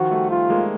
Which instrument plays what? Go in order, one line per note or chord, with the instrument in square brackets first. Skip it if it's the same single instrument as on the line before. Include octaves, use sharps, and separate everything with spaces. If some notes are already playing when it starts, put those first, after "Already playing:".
Already playing: [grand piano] D#3 F3 [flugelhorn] F#4
[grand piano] G3 A3
[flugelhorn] F4
[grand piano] G#3 A#3